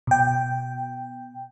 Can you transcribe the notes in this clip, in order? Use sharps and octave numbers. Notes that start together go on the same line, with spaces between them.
B2 G5